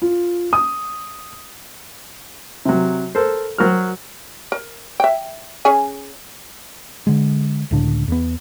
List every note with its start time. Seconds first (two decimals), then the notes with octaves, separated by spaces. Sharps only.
0.02 F4
0.53 D#6
2.65 C3 F#3
3.15 A4 A#4 C5
3.58 F#3 F#4 A#4 C5 F6
4.52 A#4
5.00 E5 G5
5.65 C#4 G#4 G#5
7.07 D3 G#3
7.71 C#2 A2 D3 D4
8.08 E2 B3